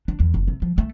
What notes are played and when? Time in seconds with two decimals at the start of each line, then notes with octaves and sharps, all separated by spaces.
0.08 D4
0.20 E2
0.34 F#1
0.48 C3
0.62 F3
0.78 A3